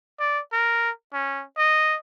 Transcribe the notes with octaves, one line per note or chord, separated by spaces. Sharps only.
D5
A#4
C#4
D#5